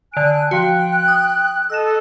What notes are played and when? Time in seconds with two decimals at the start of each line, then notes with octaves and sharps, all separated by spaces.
0.14 D3 G#5 F#6 D7
0.51 F3 F#4 G5 F#6
1.08 D#6
1.70 A4 D#5 E6 F#6 E7